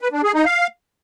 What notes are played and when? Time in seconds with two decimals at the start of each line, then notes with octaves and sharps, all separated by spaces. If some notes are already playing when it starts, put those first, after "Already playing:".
0.01 B4
0.12 D4
0.23 G#4
0.34 D#4
0.45 F5